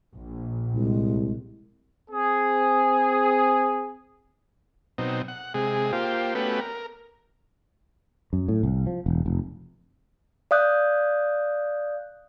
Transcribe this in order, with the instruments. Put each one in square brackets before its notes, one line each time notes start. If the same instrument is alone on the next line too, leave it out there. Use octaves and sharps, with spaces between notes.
[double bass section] A#1
[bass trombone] C2 [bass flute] G#3
[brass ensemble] C4 G#4
[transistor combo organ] B2 F#3 C4 D#4
F#5
C3 G#3 G#4
A#3 F4 G4 C5
A3 B3 C#4 F#4 G4 B4
A#4
[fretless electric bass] F#2
A2
C2
F3
E1
F1
[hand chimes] D5 F5 D#6 F#6 G6